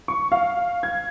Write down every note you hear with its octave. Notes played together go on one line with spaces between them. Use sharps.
C#6
F5
G#6